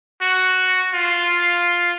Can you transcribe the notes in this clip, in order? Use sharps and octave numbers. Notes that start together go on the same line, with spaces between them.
F#4
F4